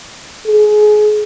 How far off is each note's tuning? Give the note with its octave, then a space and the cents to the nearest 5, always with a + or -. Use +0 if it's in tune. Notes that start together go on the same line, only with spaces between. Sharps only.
G#4 +25